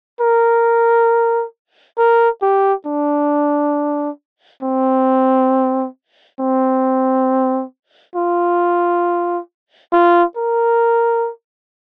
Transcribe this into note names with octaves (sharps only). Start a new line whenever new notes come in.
A#4
A#4
G4
D4
C4
C4
F4
F4
A#4